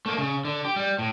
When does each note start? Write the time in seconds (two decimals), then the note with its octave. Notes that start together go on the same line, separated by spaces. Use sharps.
0.06 A3 A#3
0.18 C#3
0.45 D3
0.65 G4
0.76 G3
0.99 A2